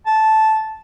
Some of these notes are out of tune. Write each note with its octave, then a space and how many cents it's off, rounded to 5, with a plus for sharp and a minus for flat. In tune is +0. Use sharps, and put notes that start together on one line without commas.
A5 -10